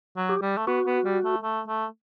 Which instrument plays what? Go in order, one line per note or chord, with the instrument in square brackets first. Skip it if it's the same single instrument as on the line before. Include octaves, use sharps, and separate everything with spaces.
[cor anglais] F#3
[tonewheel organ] G4
[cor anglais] G3
A3
[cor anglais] B3 [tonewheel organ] F#4
[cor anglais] B3
G3
A3
A3
A3